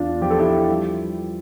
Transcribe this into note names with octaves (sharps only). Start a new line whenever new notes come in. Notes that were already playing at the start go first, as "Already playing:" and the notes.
Already playing: E2 D4 F4
F3 G4
A4
E4 G4
G3